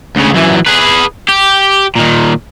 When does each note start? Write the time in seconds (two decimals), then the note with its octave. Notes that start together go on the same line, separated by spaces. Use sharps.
0.16 D2 C#3
0.34 F#2 E3
0.67 G#4 B4
1.29 G4
1.96 A#2 D#3